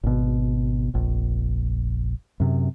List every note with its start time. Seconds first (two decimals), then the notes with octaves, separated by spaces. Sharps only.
0.03 G#1 B2
0.94 F1 A#1
2.40 F#2 C3